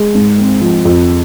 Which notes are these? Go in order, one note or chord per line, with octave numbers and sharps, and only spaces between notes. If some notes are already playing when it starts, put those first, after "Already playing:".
Already playing: G#3
G#2
C4
F3
F2